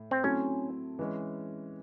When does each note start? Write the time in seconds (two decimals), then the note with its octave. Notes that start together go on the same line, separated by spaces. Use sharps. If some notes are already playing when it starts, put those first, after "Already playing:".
Already playing: A2
0.11 C4
0.23 F#3 A3 C4 C#4 E4
0.99 E3 G#3 C#4